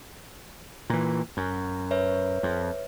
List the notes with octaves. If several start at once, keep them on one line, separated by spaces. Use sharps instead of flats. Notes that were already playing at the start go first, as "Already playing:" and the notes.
A#2 E3
F#2
B4 C#5 E5
F2